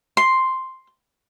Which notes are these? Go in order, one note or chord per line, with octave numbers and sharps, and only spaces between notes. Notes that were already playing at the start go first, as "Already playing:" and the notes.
C6